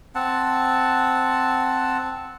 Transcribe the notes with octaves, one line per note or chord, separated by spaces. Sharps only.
C4 F#5 A5